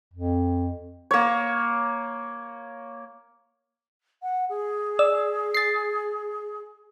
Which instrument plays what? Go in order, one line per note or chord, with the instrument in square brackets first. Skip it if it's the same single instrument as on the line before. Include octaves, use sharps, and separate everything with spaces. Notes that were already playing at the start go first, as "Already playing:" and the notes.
[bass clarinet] F2
[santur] A#3 C#5
[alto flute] F#5
G#4
[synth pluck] D5 E6
A6 C7